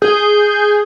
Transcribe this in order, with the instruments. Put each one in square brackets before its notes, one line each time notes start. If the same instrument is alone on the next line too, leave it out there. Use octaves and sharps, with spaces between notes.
[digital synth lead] G#4 [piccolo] G6